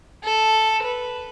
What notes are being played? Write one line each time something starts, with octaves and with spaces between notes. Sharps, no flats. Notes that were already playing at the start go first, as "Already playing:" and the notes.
A4
B4